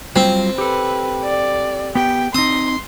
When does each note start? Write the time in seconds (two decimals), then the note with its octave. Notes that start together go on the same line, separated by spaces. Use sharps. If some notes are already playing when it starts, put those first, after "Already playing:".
0.16 F#3 G3 C4 F4
0.58 G4 A4 B4
1.24 D5
1.95 B3 G4 G5
2.34 C4 D#4 C6 D#6